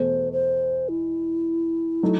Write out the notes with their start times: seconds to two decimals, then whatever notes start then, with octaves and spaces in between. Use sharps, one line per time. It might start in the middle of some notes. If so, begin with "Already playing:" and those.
Already playing: E2 B2 A3 C5
0.33 C5
0.89 E4
2.03 F#3 A3 D#4